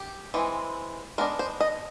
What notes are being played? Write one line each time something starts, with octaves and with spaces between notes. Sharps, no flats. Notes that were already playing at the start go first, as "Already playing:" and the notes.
Already playing: G4
E3 G#3 C4
G#3 B3 D4 A#4
C5
D#5